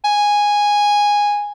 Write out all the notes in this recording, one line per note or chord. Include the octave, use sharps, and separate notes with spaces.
G#5